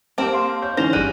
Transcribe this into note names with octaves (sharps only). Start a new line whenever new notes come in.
A#3 C4 G4 C5 A5
F5 C6
C#5 G6
G#2 D3 E3 C#4 C5 A#6 F7
G1 G3 G#3 F#6 D#7